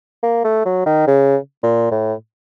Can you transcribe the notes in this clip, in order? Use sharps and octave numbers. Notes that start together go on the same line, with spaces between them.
A#3
A3
F#3
D#3
C#3
A#2
A2